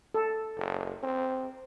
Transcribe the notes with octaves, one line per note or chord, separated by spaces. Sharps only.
A4
F#1
C4